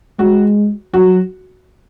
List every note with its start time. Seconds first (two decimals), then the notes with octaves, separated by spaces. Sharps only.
0.19 G#3 F#4
0.94 F#3 F#4